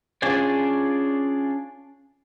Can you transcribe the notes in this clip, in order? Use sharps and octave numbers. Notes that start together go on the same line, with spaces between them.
C#4 D4 F4 G#4 C#5 D5